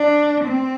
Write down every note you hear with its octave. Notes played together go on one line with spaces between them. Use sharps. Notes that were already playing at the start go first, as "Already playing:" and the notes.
Already playing: D4
C4